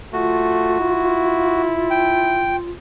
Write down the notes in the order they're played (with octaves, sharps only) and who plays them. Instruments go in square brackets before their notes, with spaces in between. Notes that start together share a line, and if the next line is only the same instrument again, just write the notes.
[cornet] A3 [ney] F4 [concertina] F#4
[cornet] E4
[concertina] G5